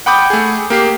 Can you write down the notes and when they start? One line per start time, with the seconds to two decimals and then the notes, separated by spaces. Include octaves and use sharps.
0.06 F#5 G5 B5 D6 D#6 G6
0.30 A3 G#4
0.70 A#3 G4 C7